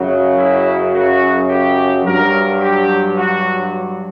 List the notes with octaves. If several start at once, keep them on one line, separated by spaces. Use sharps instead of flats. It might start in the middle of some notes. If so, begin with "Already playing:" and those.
Already playing: F#2 C#3 F#3
E4
F#4
G4
G2 F#3 A#4
G4
F#4